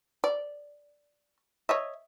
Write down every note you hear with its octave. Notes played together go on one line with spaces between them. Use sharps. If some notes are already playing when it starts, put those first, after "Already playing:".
D5
C#5 D#5 E5